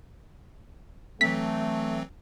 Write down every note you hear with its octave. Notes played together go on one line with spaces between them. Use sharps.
E3 F#3 A3 C4 B6